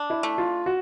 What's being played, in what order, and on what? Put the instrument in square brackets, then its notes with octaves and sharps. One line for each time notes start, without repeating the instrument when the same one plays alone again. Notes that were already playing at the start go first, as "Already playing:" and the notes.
Already playing: [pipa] D4
[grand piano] E4
[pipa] A3
[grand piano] F4
F#4